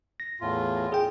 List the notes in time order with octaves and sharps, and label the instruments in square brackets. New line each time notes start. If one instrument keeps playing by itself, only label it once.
[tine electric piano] A#6
[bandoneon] E2 A2 F4
[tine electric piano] G#4 G5